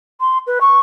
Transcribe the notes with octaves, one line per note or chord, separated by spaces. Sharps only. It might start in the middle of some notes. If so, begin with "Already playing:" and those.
C6
B4
C#6